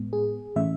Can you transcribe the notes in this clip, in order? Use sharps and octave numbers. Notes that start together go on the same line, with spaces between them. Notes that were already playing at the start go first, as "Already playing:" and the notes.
Already playing: A2 G#3 B3
G#4
A2 E3 A3 C#4 E5